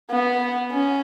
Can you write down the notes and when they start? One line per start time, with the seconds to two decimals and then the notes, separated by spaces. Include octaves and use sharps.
0.11 B3
0.72 C#4